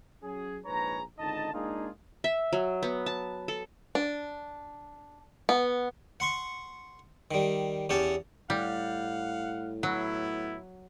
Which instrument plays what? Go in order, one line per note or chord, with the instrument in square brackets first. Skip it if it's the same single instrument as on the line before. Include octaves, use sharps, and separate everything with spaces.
[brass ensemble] F#3 C#4 G#4
A#1 G#2 G#4 B4 C#5 A#5
G#1 C#2 D3 D#4 D#5 A5
G#3 A#3 D4 D#4 F4 G#4
[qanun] E5
F#3
B3
A5
A4
[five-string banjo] D4
B3
[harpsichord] F#5 C6 C#6
D#3 G3
E2 C#4 G4 F#5 A5
[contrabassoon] A2 [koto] G3 [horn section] F5 F#5
[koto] F#3 [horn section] B3 E4